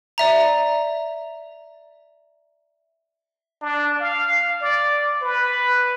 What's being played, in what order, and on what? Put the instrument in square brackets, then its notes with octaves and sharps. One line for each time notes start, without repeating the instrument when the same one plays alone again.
[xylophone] D5 E5 A#5
[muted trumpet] D4
F5
D5
B4